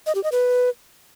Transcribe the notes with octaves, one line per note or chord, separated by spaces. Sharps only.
D#5
G4
D#5
B4